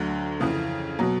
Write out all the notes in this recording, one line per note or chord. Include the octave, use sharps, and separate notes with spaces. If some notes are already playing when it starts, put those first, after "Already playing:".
Already playing: D2 D3 F#3
F2 C#3 E3
B2 F#3